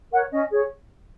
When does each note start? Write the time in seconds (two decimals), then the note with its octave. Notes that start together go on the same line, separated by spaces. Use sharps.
0.11 A#4 C#5 F#5
0.31 C#4 D#5
0.50 G#4 C#5